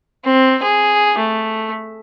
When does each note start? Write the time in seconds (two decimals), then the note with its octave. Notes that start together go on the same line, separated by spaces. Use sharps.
0.24 C4
0.62 G#4
1.18 A3